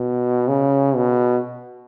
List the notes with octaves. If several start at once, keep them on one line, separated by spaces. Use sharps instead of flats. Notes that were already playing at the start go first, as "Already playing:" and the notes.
Already playing: B2
C#3
B2